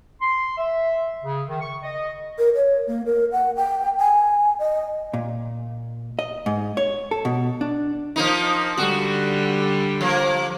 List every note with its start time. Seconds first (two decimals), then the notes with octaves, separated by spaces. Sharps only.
0.21 C6
0.58 E5
1.23 C#3
1.49 D#3
1.61 C#6
1.83 D#5
2.38 A#4
2.55 C#5
2.87 A#3
3.06 A#4
3.32 F#5
3.56 G5
3.98 G#5
4.59 D#5
5.13 A#2
6.19 D#5
6.46 G#2
6.77 C#5
7.11 A4
7.25 B2
7.61 D4
8.16 F3 A#3 D#4
8.77 D3 G3 F#4 G4
10.01 F3 A#3